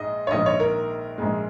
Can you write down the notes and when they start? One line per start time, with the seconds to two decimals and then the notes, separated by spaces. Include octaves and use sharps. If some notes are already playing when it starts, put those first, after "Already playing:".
Already playing: A#1 G#2 G#3 D#5
0.27 C#5
0.31 A#1 G#2 D#3 D#5
0.46 C#5
0.60 A#4
1.18 A#1 G#2 G#3